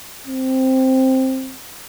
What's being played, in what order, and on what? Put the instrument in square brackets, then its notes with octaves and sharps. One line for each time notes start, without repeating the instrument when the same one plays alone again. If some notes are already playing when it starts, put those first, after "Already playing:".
[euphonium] C4